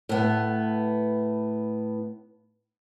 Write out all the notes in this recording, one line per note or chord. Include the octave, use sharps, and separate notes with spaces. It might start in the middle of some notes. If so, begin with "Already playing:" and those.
A2 B3